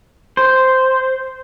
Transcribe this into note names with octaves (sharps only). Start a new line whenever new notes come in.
C5